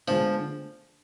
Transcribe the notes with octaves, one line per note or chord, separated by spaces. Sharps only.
D3 F3 G#3 B3 D4